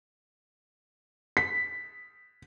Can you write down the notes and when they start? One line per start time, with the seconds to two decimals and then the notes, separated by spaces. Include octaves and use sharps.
1.37 B6